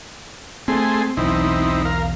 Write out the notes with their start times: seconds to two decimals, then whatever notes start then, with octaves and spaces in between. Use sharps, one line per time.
0.68 A3 C4 G#4 C6
1.17 B1 E2 C4 D#4 E4
1.85 A#4 F5